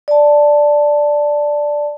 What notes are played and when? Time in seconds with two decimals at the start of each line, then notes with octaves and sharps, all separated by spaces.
0.08 D5 A5